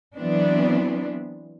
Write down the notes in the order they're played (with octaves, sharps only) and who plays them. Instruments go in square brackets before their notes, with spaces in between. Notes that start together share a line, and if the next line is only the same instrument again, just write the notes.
[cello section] E3 F#3 B3 C4 D4